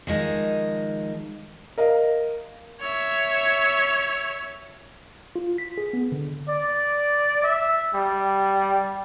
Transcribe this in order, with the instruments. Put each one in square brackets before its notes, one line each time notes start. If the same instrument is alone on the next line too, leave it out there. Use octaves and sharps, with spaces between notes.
[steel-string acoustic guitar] D#3 F3 G#3
[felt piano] A#4 D#5 F5
[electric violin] C#5 E5
[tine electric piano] F4
B6
G#4
B3
D3
[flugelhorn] D5
E5
G3